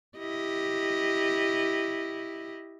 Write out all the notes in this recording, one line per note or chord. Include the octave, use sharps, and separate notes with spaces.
E4 G4 D#5